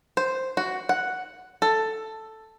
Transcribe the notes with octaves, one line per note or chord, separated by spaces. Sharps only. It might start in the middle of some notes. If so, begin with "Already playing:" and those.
C5
F#4
F#5
A4